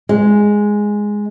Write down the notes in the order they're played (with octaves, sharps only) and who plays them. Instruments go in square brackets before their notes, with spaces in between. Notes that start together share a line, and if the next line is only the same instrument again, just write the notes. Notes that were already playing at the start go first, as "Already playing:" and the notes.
[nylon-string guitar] G#3